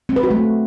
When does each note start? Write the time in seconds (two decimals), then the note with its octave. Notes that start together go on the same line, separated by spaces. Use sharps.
0.09 C4
0.16 B4
0.23 F#4
0.31 A3